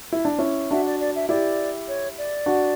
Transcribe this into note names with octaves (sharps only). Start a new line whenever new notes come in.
E4
D4
C#4 E4
D4 F#4 E5
D5
D5
E5
E4 G4 D5
C#5
D5
D4 F#4